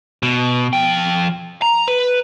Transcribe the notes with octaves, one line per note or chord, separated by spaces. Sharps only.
B2
F3 G5
A#5
B4